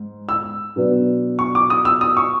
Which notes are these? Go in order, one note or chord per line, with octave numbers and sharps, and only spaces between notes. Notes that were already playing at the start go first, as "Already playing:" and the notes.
Already playing: G#2
E6
B2 F#3 B3 D4
C#6
D6
D#6
E6
D#6
C#6